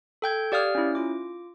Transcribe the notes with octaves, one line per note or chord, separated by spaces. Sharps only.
A4 G5 G6 G#6
G4 D5 F5 D#6 F6
C#4 E4
F4 D6